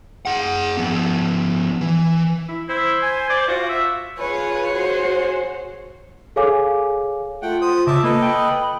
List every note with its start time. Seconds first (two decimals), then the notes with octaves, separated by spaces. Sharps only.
0.25 G#4 F#5
0.77 F3 B3
1.81 E3
2.49 E4
2.69 E4 C5
3.02 G#5
3.29 D5
3.48 F4 F#4
3.69 E5
4.19 F4 G#4 B4 C#5
4.74 F#4 C5
6.36 G#4 A4 C#5 F5 G#5 D6
7.42 A3 F4 F#5 G5
7.62 C5 D#6
7.87 C#3 E5 A5 D6
8.04 A#3 A4 B4 D#5
8.22 G5 B5